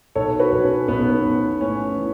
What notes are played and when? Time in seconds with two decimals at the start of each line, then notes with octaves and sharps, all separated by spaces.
0.15 B1 A4 C#5
0.40 F#4 B4
0.52 B1
0.64 C#4
0.88 B1 B3
1.10 B3
1.25 B1
1.61 A2 C#4
1.98 E3